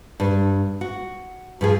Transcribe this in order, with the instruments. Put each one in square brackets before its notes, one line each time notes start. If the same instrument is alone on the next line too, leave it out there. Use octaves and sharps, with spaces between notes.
[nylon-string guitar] G2 G3
F#4
G2 F3 G#4